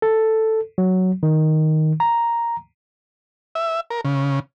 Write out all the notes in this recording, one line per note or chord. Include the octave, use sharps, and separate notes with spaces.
A4
F#3
D#3
A#5
E5
A#4
C#3